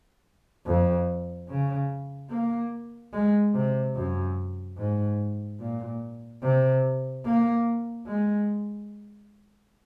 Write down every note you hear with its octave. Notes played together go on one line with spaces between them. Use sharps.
F2
C#3
A#3
G#3
C3
F#2
G#2
A#2
C3
A#3
G#3